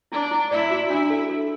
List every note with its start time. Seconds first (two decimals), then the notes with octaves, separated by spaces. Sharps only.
0.12 D4 E4 D5
0.31 E4
0.51 E4 D5 E5
0.71 F#4
0.90 D4 E4 E5
1.10 A4
1.30 A4